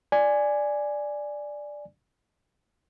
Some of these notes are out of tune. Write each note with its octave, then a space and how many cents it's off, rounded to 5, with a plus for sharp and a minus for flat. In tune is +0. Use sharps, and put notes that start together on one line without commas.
D5 +0 G#5 +0